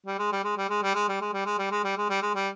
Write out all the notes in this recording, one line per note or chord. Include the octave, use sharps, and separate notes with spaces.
G3
G#3
G3
G#3
G3
G#3
G3
G#3
G3
G#3
G3
G#3
G3
G#3
G3
G#3
G3
G#3
G3